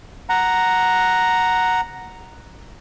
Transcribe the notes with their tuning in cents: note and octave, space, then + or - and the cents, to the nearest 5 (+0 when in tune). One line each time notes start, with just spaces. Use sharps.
F#5 +0 A#5 +0